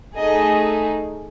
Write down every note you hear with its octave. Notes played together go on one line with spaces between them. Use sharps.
A3 D#4 G#4 D#5